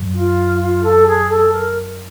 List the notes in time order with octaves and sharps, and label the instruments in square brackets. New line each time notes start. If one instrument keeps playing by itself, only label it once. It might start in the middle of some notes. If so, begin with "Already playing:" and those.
Already playing: [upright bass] F#2
[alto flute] F4
F4
A4
G#4
A4
A#4